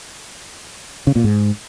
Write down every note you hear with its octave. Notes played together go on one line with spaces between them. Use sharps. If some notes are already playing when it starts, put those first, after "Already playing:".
C#3
A#2
G#2